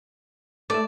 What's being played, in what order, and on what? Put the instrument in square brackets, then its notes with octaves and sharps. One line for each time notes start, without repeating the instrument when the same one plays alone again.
[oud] A3 E5 [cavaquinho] D5